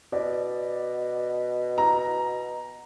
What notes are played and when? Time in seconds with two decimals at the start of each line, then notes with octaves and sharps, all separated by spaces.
0.12 B2 D5
1.78 A#5